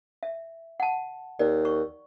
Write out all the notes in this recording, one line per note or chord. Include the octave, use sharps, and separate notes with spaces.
E5
F#5 A5
D#2 D5
C#6